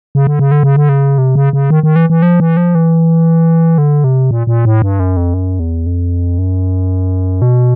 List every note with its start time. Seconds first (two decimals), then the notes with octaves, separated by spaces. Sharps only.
0.15 C#3
0.27 D3
0.39 C#3
0.51 D3
0.63 C#3
0.76 D3
0.89 C#3
1.18 C3
1.35 C#3
1.53 C#3
1.70 D#3
1.83 D#3
1.96 E3
2.10 E3
2.22 F3
2.40 E3
2.57 F3
2.75 E3
3.78 D3
4.04 C3
4.31 A#2
4.47 A#2
4.65 A2
4.82 G2
5.00 F#2
5.17 F2
5.34 F#2
5.59 E2
5.86 F2
6.38 F#2
7.42 B2